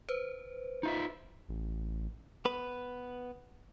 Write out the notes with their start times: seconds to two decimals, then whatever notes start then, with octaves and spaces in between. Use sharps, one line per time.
0.09 B4 C5
0.83 D#4 F4 E5
1.49 A1
2.45 B3 B4